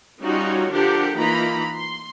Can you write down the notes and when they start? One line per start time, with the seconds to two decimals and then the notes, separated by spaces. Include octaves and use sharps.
0.22 G3 C#4 D#4 F4 F#4 C#5
0.72 D3 F3 D4 G4 A#4 F#5
1.18 E3 A#3 D#4 F4 A#5 B5
1.76 C6